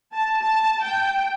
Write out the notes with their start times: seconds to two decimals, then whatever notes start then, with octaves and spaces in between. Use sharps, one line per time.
0.13 A5
0.40 A5
0.83 G5